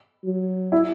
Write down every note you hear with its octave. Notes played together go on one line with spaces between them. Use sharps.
F#3
E4